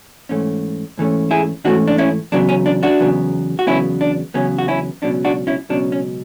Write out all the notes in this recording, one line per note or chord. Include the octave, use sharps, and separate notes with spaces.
G#2 E3 A3 C#4
G#2 E3 A3 C#4
E4 G#4
G#2 E3 A3 C#4 D4 F#4
D4
C#4 E4
E2 C#3 F#3 B3 D4
C#4
D4
D4 F#4
E2 C#3 F#3 B3
F#4
E2 C#3 F#3 B3 C#4 E4
D4
E2 C#3 F#3 B3 C#4
F#4
C#4 E4
C#2 B2 F#3 C#4 D4
D4 F#4
C#4 E4
C#2 B2 F#3 C#4 D4
C#4